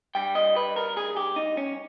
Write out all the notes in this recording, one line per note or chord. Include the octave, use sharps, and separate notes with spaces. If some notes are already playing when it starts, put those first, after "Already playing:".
G2 G3 G5
D#5
B4
A#4
G#4
G4
D#4
C#4